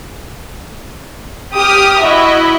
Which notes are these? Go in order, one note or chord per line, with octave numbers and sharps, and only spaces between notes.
G4 D#6 F6
E4 F#4 D#5 E5